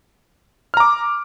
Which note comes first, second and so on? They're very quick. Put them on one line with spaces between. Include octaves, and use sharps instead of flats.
F6 A#5 D6